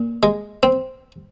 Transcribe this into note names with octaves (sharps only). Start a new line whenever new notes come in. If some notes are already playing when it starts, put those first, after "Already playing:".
Already playing: A#2
G#3
C4